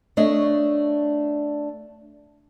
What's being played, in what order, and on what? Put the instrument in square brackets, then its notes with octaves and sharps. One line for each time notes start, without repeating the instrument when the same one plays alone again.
[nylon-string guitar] A3 D4 C#5 D#5